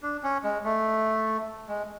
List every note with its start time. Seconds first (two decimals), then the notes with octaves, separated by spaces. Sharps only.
0.03 D4
0.23 C#4
0.44 G#3
0.65 A3
1.68 G#3